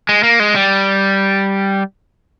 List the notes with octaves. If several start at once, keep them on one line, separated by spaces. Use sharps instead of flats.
G#3
A#3
G#3
G3